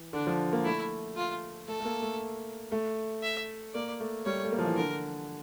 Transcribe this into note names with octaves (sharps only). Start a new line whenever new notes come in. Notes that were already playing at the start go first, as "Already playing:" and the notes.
Already playing: E3
D3 D4
F3
A#3
A3 E4
F4
A3 A4
A3
A#3
A3
A3
E5
A#3 D5
A3
G3 C#5
A3
A#3
F3
E3
D3 A#4